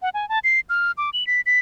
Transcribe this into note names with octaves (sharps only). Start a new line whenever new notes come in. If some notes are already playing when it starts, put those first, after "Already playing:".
F#5
G#5
A5
C7
F6
D6
F#7
B6
B6